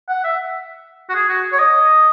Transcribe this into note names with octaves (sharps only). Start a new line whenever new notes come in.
F#5
E5
F#4
G#4
F#4
C#5
D#5